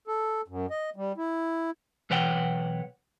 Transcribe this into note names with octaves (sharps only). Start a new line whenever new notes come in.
A4
F#2
D#5
G3
E4
B1 E3 B4 C#5 F#5 G5